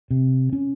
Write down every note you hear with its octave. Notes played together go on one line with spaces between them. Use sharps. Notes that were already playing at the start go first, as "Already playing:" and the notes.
C3
C#4